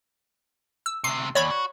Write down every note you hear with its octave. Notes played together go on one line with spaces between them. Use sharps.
E6
D2 C3 C7
D#2 C#5 D5 B5
F#4